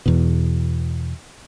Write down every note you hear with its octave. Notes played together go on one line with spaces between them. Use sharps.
E2 B2